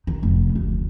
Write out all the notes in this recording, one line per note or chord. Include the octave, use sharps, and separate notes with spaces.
D#3
F1
D2